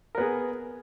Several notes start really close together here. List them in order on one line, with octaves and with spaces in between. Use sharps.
A#4 B3 G#4